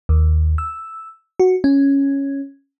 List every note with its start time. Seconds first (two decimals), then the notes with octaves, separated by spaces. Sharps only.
0.09 D#2
0.58 E6
1.40 F#4
1.64 C#4